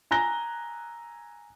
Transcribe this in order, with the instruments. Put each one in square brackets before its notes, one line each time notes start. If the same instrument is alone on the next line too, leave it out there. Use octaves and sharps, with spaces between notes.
[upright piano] G#5 A#5 F#6 A#6 G7